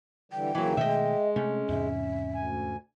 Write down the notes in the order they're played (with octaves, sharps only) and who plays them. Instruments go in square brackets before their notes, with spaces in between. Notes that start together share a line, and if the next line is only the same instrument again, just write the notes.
[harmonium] D3 E3 G3 [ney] G5
[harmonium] D#2 C#3 A#3 [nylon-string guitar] E3 F#3
[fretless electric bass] B2 D#3 A3 [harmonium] G#3 [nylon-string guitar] D#5 E5
[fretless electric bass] C3 A3 [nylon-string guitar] C#4
[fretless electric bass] E2 G#2 C3 [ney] E5
[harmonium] D2 G#5